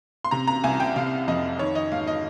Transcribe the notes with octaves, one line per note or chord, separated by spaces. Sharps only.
C6
C3 A#5
A#5
C2 G#5
G5
C3 F5
F2 D#5
D#3 C#5
D#5
G#2 F5
D#5